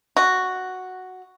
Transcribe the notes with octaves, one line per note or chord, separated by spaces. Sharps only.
F#4